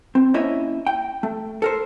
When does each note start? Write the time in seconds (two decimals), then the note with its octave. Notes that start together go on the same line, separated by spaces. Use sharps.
0.15 C4
0.34 A#3 C#4 E4 C#5 D#5 E5
0.87 G5
1.23 A3
1.62 A4 A#4 C5